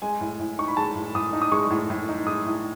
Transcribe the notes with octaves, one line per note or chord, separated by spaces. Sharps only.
G#3 G#5
A2
A2
D#4 C#6
B5
G#3 A5
A2
A2 D#6
D#4
D#6
G#3 C#6
A2
A2
D#4
G#3 D#6
A2